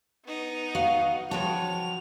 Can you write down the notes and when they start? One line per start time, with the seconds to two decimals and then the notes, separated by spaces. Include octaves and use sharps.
0.25 B3 D#4
0.75 F#4 F5
1.31 F3 F#4 B4 C#5 G5 A5 F7